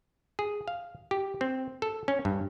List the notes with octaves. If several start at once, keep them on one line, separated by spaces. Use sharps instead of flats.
G#4
F5
G4
C4
A4
C#4
G2